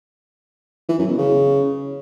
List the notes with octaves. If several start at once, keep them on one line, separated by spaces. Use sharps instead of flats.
E3
F#2
B2
C#3